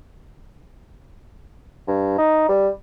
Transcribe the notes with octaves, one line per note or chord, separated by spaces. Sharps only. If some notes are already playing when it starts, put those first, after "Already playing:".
G2
D#4
G3